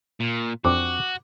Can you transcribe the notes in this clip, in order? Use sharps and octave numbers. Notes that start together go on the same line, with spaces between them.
A#2
F2 C4 D4 F#4 D6